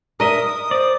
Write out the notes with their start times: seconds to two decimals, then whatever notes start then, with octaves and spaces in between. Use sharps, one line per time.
0.20 A#4 D#5 E5 D#6
0.71 C5 D5